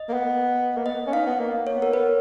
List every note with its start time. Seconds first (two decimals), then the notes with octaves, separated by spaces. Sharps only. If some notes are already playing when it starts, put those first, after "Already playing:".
Already playing: D#5
0.09 A#3
0.13 B3
0.77 A#3
0.86 B3 D#5
1.07 C#4
1.13 D#4 F5
1.27 B3
1.40 A#3
1.67 C#5
1.76 B3
1.82 A#4
1.93 B3 B4